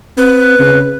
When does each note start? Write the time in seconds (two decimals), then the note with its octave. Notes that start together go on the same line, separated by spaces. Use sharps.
0.17 C4 B4
0.59 C#3